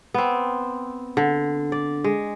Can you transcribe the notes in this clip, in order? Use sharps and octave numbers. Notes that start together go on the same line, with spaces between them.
B3 C4
D3
D5
G#3